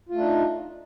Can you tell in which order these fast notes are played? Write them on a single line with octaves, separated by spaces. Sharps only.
F4 A3 D4 D#4